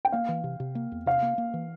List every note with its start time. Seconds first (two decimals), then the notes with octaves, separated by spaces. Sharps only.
0.05 G5
0.12 A#3 F5
0.29 E3
0.44 C3
0.60 C3
0.75 A#3
0.92 E2
1.06 C3 F5
1.22 A#3
1.38 A#3
1.54 E3